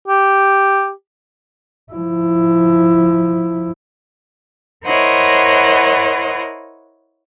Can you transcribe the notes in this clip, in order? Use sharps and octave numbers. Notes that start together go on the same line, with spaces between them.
G4
F3 E4
E4 A#4 C5 C#5 D#5 F#5